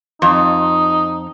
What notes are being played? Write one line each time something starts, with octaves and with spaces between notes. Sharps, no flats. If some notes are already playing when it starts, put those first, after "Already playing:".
F2 D#4